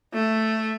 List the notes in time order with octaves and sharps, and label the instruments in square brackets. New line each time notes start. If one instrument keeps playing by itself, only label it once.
[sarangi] A3